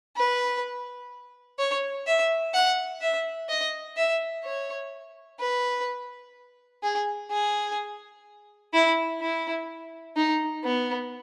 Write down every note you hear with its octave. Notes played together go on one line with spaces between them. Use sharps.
B4
C#5
E5
F#5
E5
D#5
E5
C#5
B4
G#4
G#4
E4
E4
D#4
B3